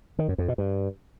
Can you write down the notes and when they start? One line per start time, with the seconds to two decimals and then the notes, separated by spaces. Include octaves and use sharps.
0.19 D#3
0.28 F#2
0.38 F2
0.48 B2
0.58 G2